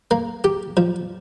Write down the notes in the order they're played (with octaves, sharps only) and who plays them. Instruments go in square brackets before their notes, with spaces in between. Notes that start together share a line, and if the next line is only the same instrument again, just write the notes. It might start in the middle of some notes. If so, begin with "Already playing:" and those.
[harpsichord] A#3
G4
F3